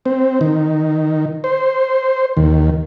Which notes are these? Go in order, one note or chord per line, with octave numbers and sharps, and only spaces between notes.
C4
D#3
C5
D#2